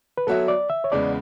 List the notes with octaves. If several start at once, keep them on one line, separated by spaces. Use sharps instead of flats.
B4
F#3 B3 F#4 A4 C#5 E5
D5
E5
C#5
E2 C#3 G#3 B3 D5